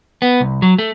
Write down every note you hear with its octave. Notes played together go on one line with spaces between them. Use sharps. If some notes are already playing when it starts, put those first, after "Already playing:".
B3
C2
F#3
A3